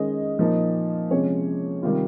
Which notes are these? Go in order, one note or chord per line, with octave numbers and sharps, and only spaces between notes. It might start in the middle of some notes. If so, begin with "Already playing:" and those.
Already playing: D#3 G#3 C#4 D#5
A#2 F3 A#3 D#4
C3 F3 G#3 C#4 C#5
C3 D#3 G3 F4